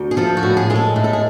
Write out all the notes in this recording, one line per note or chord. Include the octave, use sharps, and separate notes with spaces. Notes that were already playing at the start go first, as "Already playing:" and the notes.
Already playing: D2
G#4
F3 A4
F#4
A2
G#4
G#3 G#4
A4
A2
A4
G#4